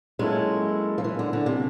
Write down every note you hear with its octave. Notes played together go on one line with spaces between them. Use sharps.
F#3 G#3 A#3 C#4 E4 A4
F3
E3
D3
D3
C3